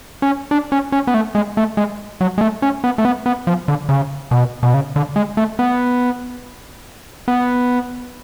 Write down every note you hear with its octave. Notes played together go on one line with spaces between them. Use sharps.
C#4
D4
C#4
C#4
B3
A3
G#3
A3
G#3
F#3
G#3
A3
C#4
B3
A3
B3
B3
F3
D3
C#3
B2
B2
C#3
D3
G#3
A3
B3
B3